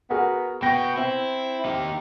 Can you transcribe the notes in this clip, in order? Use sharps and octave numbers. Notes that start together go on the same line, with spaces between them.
B3 F#4 G#4 A#4
B2 B3 G5 A#6
C4 E4
D#4 G4